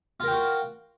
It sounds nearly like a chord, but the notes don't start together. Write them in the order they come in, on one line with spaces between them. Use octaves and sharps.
F4 A#4 G5 F#4